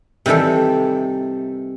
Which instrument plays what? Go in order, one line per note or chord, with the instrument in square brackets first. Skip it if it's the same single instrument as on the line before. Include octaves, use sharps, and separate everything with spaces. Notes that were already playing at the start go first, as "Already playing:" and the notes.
[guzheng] C3 D#3 E3 G3 A4